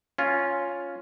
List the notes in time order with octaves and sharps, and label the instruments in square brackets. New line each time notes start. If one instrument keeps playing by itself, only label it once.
[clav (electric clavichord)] C#4 F4